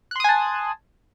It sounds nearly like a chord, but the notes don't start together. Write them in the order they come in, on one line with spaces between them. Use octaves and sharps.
F#6 C6 D#6 G#5 A5